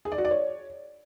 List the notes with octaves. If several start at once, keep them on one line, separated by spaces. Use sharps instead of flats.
G#4
D5
F#4
D5
C#5